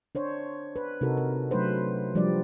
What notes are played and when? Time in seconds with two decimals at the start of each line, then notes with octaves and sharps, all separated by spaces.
0.15 D4 C5 C#5
0.76 B4
1.01 C3 D#4 F#4 A4 A#4
1.17 A#4
1.51 F#3 A3 D4 B4 C5
2.15 F3 G3 D4 D5